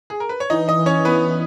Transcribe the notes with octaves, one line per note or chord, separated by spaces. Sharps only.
G#4
A#4
B4
C#5
E3 D#4 D#5
D#4 D#5
E3
C#4 C#5
E3 B3 B4